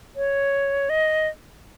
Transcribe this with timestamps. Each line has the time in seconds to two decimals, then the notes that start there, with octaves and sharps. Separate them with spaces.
0.16 C#5
0.90 D#5